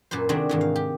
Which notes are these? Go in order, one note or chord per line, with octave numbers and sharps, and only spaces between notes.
F#2 A#2 B4 C5
C3 D#3 G#3 C4 D4 F#4
G#2 D#3 E3
F5
G4